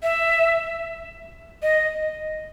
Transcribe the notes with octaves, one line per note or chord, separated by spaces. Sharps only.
E5
D#5